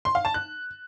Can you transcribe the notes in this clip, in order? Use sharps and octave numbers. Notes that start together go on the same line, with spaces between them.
C6
F5
A5
F#6